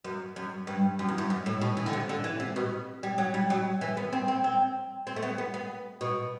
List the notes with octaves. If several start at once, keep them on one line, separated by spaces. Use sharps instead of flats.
F#2
F#2
G2
F#2
E2
F#2
F#2
A2
B2
E3
D3
C3
D3
E3
C3
B2
G3
F#3
G3
F#3
E3
B3
C4
C4
C4
C4
A3
B3
B3
B3
B2